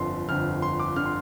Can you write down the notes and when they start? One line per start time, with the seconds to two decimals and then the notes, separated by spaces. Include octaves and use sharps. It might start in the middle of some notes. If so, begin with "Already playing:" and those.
Already playing: G1 F2 D3 C6
0.28 G1 F2 D3 F6
0.62 C6
0.80 D6
0.96 D3 F6
1.06 C6